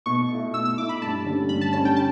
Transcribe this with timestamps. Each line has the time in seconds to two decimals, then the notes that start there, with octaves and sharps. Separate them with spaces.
0.06 B2 C#6
0.30 A3 E4
0.54 B2 E6
0.65 E6
0.78 A3 E4 D6
0.89 B5
1.02 G2 A5
1.25 D3 G3 C#4
1.49 G2 B5
1.61 A5
1.73 D3 G3 C#4 A5
1.85 G5
1.96 A5